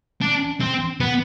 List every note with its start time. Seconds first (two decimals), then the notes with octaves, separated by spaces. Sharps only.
0.21 D4
0.61 C4
1.00 B3